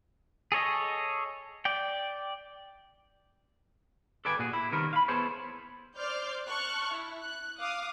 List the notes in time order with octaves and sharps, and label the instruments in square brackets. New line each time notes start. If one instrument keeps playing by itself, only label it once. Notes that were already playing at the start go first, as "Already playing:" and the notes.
[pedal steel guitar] G#4 A4 C#5 D#5
D5 G5
[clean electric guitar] A4 B4 D5 G5 G#5
A#2 F#4 G#4
E4
C2 C3 D#3 B3 A#4
F5 B5
B3 E4 G#4 A4 C5 C#5
[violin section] C5 D5 C6 D6 F6 G6
A5 C#6 F6 F#6
E4
F#6
F5 D6 D#6